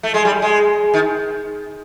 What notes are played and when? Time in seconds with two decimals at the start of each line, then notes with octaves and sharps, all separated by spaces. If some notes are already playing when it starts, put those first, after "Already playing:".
0.03 A3
0.14 G#3
0.25 G3
0.42 G#3
0.94 D#3